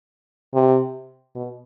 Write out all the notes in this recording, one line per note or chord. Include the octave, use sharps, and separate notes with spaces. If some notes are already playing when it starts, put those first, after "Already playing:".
C3
B2